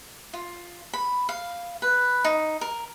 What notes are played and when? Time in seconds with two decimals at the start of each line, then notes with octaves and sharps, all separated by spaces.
0.33 F4
0.93 B5
1.29 F5
1.82 B4
2.24 D#4
2.61 A#4